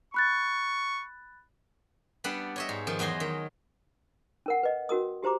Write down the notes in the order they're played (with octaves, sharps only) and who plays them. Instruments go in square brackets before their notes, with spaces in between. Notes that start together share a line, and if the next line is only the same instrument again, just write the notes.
[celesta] B5 F#6 A6 [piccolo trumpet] C#6
[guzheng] G3 B3 D4 F#5
C#5 D#5 E5
G#2
D#3 F3
E2 F#3 D#5 G#5 C6
D#3
[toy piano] C#4 A#4 F#5
B4 D#5
C#4 F#4 A#4 D#6
F#4 G4 C5 A#5 D6